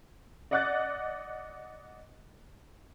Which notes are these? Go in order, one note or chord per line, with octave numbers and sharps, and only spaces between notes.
D5 D#5 F#5 D6 F#6 A6